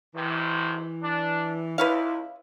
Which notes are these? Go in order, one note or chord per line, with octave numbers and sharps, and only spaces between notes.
G#1 C3 E3
D4
C#2 E4 B4 C#5 F5